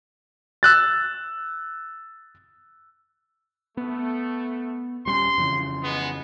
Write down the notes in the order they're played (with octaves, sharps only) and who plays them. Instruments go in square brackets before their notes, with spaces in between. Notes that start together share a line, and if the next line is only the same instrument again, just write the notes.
[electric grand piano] E6 F#6 A6
[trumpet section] A3 [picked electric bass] B3
[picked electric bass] D#1 G3 C#4 [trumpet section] C6
[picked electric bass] F2 C#3 E3
[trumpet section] G#3 B3